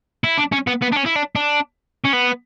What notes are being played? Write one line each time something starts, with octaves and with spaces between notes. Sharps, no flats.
E4
D4
C#4
B3
B3
D4
C#4
E4
D4
D4
C#4
B3